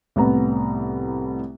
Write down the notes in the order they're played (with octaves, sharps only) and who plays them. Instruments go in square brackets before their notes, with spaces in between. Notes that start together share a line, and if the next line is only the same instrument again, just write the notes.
[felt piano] C2 A2 B3 A#5